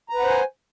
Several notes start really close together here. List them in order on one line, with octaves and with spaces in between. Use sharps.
A#5 B4 F#5 C5 G#5